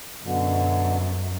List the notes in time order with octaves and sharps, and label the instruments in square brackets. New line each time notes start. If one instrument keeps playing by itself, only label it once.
[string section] F#2 [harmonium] B2 D3